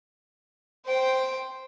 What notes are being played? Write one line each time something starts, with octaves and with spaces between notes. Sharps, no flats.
C5 G5